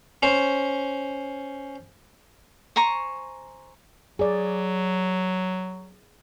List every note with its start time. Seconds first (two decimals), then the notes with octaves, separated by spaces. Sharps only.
0.23 C#4 C5
2.76 C5 G#5 A#5 C#6
4.19 F#3 G#4 D5